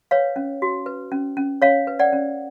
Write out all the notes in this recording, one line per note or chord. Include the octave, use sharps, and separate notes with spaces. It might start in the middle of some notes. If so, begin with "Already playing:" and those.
B4 C#5 F5
C#4
F#4
B4
C#4
C#4
C#4 C#5 F5
B4
D5 F#5
C#4